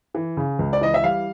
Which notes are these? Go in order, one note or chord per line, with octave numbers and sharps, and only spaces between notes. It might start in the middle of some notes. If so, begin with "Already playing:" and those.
E3
C#3
C#2
D5
E3 D#5
E5
G3 F5